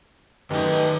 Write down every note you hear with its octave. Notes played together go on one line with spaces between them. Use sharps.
F#2 D#3 A3 D#4 G4 B4 D#5 A5